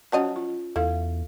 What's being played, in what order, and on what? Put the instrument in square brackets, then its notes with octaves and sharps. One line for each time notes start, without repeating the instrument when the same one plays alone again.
[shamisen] F3 F#3 D#5 [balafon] C#4 C#5 A5
[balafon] F4
[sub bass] E2 [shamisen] E4 [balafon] A4 F5